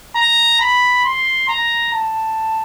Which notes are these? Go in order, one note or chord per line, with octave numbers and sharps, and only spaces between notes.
A#5
B5
C6
A#5
A5